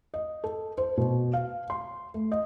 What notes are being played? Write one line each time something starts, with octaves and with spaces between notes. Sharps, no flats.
D#5
A4
C5
B2
F5
C6
A3
D#5